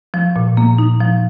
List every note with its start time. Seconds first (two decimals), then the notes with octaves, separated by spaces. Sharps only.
0.14 F3
0.36 A#2
0.57 A#3
0.78 D#4
1.00 F3